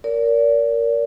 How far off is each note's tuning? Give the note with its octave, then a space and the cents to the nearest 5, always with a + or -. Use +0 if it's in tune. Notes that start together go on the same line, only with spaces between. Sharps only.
A#4 +0 D5 -35